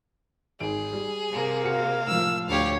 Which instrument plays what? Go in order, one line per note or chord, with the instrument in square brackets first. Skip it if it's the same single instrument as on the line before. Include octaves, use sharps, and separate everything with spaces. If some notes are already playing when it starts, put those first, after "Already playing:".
[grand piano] G#1 D7 [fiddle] G#4
[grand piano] G3
[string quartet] C3 A#3
[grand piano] F#4 G#4 C#7 [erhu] F5
[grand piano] A2 F3 [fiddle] E6
[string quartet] D2 C#5 [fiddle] G4 F5